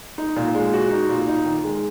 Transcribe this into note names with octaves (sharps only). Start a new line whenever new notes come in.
D#4
A#2
G#3
F#4
D#4
A#2
D#4
D#3
G#3